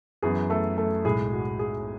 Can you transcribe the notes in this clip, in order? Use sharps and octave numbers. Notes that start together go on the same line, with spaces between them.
F#2 E3 B3 G#4
A3 A4
A3 A4
B1 A2 G#3 G#4
F#4
G#4